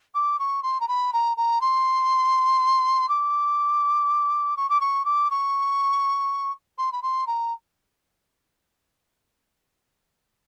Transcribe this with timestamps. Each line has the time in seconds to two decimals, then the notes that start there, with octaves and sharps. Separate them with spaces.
0.14 D6
0.39 C#6
0.63 C6
0.80 A#5
0.88 B5
1.13 A#5
1.37 A#5
1.61 C6
3.08 D6
4.57 C#6
4.69 D6
4.80 C#6
5.05 D6
5.30 C#6
6.78 C6
6.92 B5
7.02 C6
7.27 A#5